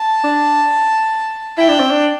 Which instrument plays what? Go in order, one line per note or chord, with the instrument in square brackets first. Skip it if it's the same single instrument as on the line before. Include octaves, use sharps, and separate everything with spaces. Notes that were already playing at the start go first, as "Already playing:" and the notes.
Already playing: [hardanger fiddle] A5
[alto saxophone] D4
[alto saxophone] E4 [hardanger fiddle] G5
[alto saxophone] D4
C4
D4